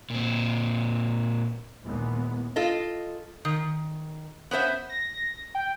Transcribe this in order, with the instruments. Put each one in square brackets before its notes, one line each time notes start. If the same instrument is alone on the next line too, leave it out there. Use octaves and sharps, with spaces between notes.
[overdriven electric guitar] A#2 C4
[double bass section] D#2 A#2 E3 G#3 B3
[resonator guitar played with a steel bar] F4 A4 D#5
D#3
B3 C#4 C5 E5
[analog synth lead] A#6
G5